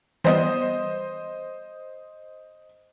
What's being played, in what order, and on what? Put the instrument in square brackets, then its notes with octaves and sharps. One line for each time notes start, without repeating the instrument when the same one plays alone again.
[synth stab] E3 G3 B3 [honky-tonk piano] C5 D#5